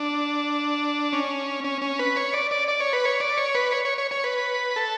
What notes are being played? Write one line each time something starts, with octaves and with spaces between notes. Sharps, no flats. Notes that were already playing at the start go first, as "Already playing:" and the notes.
Already playing: D4
C#4
C#4
C#4
B4
C#5
D5
D5
D5
C#5
B4
C#5
D5
C#5
B4
C#5
C#5
C#5
C#5
B4
A4